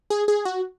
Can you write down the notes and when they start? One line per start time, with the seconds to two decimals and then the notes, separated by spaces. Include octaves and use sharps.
0.10 G#4
0.28 G#4
0.45 F#4